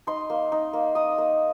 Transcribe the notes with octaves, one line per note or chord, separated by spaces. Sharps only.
D#4 C6
A#3
D#4
A#3
D#4 D#6
A#3